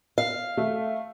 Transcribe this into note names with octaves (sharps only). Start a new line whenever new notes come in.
F5
A3